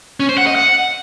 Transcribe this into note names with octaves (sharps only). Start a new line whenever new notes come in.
C#4
C5
F#5
D#5
F#5